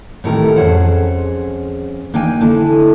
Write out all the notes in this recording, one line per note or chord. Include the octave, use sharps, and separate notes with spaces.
A2 C3 D#3 A3 G4 A#4
F2 C#4 G#4 C5 F#5
A#3 D4 D#4 G5 G#5
D3 D4 E4